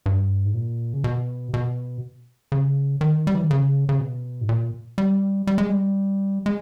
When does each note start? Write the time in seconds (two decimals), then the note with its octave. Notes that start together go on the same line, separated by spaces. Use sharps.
0.06 G2
0.45 G#2
0.54 A#2
0.93 C#3
1.04 B2
1.54 B2
2.52 C#3
3.01 D#3
3.27 G3
3.34 E3
3.42 D#3
3.51 C#3
3.89 C#3
3.99 B2
4.41 G#2
4.49 A#2
4.98 G3
5.47 G3
5.58 G#3
5.69 G3
6.46 G#3